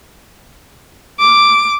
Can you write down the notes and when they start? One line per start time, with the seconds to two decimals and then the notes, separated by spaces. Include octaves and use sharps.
1.20 D6